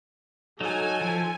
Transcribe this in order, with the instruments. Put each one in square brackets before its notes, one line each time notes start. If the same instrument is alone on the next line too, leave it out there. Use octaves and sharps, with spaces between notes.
[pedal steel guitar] F#3 D#4 [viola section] A4 G#5
[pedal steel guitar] F3